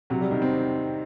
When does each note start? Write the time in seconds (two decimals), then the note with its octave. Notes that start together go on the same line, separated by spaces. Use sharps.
0.10 C3 F#3
0.21 G3
0.31 D#3
0.42 C4